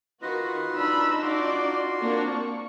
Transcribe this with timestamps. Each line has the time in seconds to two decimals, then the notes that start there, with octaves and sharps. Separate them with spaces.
0.22 D#3 F4 F#4 B4 D#5
0.76 D4 D#4 B5 E6
1.22 F4 F#4 D5 C6
2.01 A#3 C4 D4 C#6
2.31 A#3